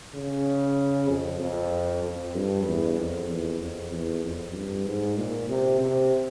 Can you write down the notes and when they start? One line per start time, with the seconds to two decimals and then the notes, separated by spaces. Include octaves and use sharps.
0.15 C#3
1.09 F2
1.40 F2
2.03 F2
2.35 G2
2.66 E2
2.98 F2
3.29 E2
3.60 F2
3.91 E2
4.23 F2
4.55 G2
4.86 G#2
5.18 A#2
5.49 C3
5.80 C3